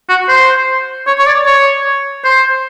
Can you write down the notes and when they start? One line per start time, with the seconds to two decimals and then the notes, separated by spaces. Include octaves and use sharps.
0.09 F#4
0.29 C5
1.07 C#5
1.19 C#5
1.27 D5
1.46 C#5
2.25 C5